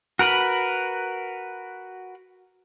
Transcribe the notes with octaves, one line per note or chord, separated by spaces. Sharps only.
F#4 A#4 B4 B5